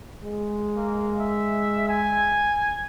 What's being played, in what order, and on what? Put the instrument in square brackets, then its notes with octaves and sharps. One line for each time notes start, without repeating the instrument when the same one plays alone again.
[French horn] G#3
[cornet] A#3
E5
G#5